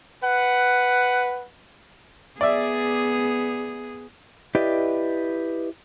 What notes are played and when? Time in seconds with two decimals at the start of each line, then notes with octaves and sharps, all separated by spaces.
0.23 B4 F#5
2.41 B3 G#4 D5 E5
4.55 E4 G4 B4 D5 D#5